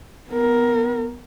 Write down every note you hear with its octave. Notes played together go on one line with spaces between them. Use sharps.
B3 A#4